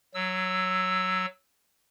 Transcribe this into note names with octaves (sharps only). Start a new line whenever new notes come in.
F#3 E6